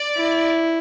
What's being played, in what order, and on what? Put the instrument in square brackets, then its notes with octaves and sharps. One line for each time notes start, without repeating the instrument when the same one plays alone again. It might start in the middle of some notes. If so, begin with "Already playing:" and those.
Already playing: [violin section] D5
[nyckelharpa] E4